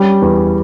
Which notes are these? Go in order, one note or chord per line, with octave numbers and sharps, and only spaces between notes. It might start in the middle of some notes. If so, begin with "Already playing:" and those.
Already playing: G3 C#4
E2